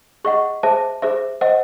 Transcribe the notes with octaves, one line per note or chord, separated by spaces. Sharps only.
G#4 D#5 F#5 C#6
G#4 C5 E5 A5
G#4 C5 E5
C5 D#5 F#5